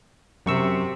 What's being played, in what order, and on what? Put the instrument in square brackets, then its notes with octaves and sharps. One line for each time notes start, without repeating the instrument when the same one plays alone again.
[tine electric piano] F#2 C#6 E6 [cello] C3